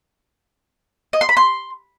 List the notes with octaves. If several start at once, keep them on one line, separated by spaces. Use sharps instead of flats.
D#5
C6
B5
C6